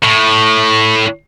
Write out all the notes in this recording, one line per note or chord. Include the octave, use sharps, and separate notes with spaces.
A2